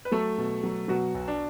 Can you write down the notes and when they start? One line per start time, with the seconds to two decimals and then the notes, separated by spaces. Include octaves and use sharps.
0.05 B4
0.12 F#3 A3 A4
0.38 B2
0.63 F#3
0.88 B2 F#3 F#4
1.14 B1
1.28 D4